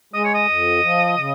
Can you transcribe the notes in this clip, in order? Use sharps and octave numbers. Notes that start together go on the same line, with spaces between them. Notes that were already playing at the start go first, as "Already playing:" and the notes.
G#3 D#5
C#5
D#5
F2
F3
C#3